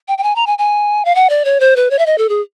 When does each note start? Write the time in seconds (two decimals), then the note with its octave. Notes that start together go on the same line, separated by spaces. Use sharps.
0.08 G5
0.18 G5
0.23 G#5
0.36 A#5
0.47 G#5
0.58 G#5
1.05 F5
1.15 F#5
1.30 D5
1.45 C#5
1.60 C5
1.76 B4
1.91 C#5
1.99 E5
2.06 D#5
2.18 A4
2.29 G#4